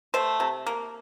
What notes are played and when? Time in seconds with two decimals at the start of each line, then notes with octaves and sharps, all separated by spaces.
0.14 A3 C5
0.40 C3
0.66 A#3